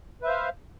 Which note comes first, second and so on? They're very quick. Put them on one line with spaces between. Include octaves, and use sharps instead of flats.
B4 E5 C5 F5